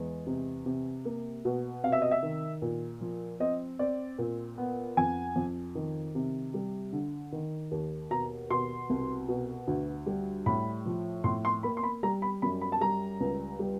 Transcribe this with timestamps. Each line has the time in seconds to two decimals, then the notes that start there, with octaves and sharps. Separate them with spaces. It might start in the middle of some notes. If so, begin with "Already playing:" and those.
Already playing: E2 G#3
0.27 C3
0.66 C3
1.05 A#3
1.45 B2
1.84 C3 F5
1.92 E5
2.02 D#5
2.11 E5
2.23 D#3
2.62 A#2
3.01 F3
3.40 C4 D#5
3.79 C4 D5
4.18 A#2
4.58 B3
4.97 F2 G#5
5.36 F2
5.75 D#3
6.15 C3
6.54 G3
6.93 D3
7.32 D#3
7.71 D#2
8.11 B2 A#5
8.50 B2 C6
8.90 C2
9.28 B2
9.67 D2
10.06 G3
10.46 A2 B5
10.86 F3
11.24 A2 C6
11.45 C6
11.63 A#3 B5
11.77 C6
11.83 B5
12.03 G3 A#5
12.22 B5
12.42 F#2 B5
12.61 B5
12.72 A5
12.81 G3 A#5
13.20 C#2
13.59 G3